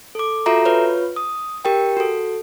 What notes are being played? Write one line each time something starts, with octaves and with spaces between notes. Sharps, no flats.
A4 D6
F4 F#4 A4 E5 A#5
F4 B4 C#5
D#6
G4 A#4 G5
F#4 A4